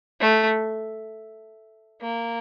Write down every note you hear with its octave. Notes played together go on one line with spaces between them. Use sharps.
A3
A#3